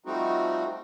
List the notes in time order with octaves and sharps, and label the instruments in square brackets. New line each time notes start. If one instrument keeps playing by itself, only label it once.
[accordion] F3 G3 A3 C4 D#4 F#4